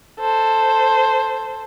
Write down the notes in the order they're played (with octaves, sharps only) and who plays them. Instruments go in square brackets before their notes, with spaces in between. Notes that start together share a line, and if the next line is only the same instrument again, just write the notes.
[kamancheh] A4 C5